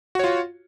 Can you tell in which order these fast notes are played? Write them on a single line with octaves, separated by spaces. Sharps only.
F#4 C#5 F4